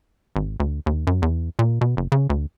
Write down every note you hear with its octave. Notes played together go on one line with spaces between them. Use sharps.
G#1
D2
D#2
F#2
E2
A#2
B2
F#1
C#3
D2